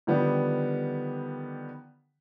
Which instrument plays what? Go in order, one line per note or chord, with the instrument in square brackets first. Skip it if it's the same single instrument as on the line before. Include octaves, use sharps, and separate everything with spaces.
[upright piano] D3 D#3 F3 G3 B3 D4